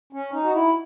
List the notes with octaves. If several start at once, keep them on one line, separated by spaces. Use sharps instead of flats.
C#4
D#4
F#4
E4